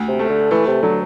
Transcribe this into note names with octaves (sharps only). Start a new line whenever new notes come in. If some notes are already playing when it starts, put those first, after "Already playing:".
Already playing: D2
C3
A3
D3
E3 A3
C3
D3 F#3